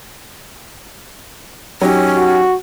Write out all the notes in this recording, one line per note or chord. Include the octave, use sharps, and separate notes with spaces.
F#3 C#4 D#4 G4
F#4